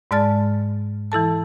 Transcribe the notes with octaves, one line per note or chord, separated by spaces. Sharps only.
G#2 G#3 D5 A5 F6 A6
E3 E4 A4 A5